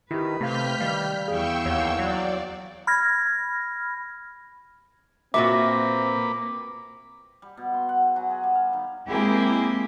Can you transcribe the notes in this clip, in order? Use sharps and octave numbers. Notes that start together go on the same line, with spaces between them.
D#3 E4 G4 B4
C3 A3 F5 F6 G6 B6
D#3 G3 F5
E2 G#4 F5 G5 C#6 E6
D#2 C#5 F#5
F#3 D5
B5 F6 G#6 A#6
A#2 A#3 C4 F#4 B4 E5 D6
G3
B2
C6
F#5
G#4
F#3
G#4
G3
F5
D#3
G#3 A#3 C4 E4 G4 G#4